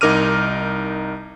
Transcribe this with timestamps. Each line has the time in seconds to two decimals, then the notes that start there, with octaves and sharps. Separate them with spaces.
0.01 C2 D#4 A#4 D6 F6 D#7